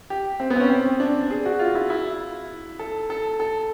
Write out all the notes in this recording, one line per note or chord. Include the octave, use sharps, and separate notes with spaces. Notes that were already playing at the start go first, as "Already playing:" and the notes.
G4
C4
B3
C4
C#4
C4
D4
G#4
F#4
F4
E4
E4
A4
A4
A4